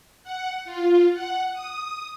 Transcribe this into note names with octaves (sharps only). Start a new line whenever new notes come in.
F#5
F4
F#5
D#6